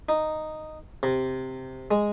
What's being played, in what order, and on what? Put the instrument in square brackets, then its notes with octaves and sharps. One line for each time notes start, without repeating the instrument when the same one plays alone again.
[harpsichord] D#4
C3
G#3